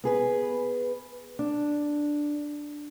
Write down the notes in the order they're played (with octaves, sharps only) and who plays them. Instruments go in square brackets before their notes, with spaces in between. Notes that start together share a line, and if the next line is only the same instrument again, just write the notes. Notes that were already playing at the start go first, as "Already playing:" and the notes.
[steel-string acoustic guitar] B3 G#4 B4
D4